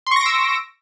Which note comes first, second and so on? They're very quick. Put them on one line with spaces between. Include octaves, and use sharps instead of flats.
C6 C#6 A#6 D7 E6